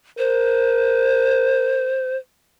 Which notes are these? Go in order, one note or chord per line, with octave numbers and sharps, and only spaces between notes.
A#4 C5